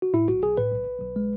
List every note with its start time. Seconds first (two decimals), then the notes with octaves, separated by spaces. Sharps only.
0.02 F#4
0.13 A2 E4
0.28 B1 F#4
0.43 B1 G#4
0.57 A2 B4
0.72 B1
0.87 B1
1.01 B1
1.16 G#3